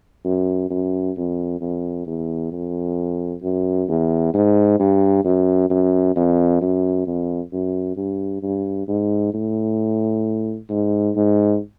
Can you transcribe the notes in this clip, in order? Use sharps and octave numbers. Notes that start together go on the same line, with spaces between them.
F#2
F#2
F2
F2
E2
F2
F#2
E2
G#2
G2
F#2
F#2
F2
F#2
F2
F#2
G2
G2
G#2
A2
G#2
G#2